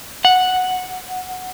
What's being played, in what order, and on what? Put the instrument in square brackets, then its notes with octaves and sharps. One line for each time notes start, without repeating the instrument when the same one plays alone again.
[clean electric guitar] F#5